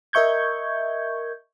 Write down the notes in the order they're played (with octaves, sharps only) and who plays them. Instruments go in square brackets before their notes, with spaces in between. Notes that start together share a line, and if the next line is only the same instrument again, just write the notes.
[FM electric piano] A#4 D#5 E5 C#6 G6 G#6